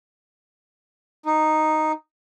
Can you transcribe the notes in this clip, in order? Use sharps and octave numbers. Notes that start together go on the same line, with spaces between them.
D#4